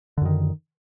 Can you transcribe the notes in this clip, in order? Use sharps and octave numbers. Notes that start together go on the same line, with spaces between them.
F#2 D3 D#3